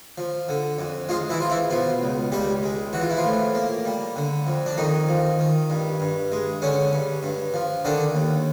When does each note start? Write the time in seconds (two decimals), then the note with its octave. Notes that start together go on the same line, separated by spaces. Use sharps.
0.18 F3
0.49 D3
0.78 F2
1.09 F3 G#3 F4
1.30 E3 E4
1.40 F3 F4
1.50 E3 E4
1.70 B2 F3 F4
2.01 C#2
2.32 C#2 G3 G4
2.63 G#3
2.93 E3 F#4
3.02 F4
3.10 E4
3.17 F3 F4
3.24 A2
3.55 A#3
3.85 G3
4.16 D3
4.47 F2
4.66 D4
4.77 F2 D#3 D#4
5.09 F3
5.39 D#3
5.70 G2
6.00 G2
6.32 G#3
6.62 D3 C#4
6.93 G2
7.23 G2
7.54 F3
7.85 D3 D#3 D4
8.15 D#2